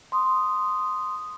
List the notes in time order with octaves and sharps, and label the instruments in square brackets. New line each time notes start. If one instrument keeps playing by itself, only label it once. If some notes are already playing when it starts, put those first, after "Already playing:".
[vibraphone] C6 D#6